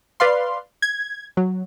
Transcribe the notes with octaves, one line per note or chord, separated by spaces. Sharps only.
B4 D5 F5 C6
G#6
F#3